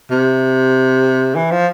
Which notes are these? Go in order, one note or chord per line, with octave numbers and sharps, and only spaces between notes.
C3
E3
F3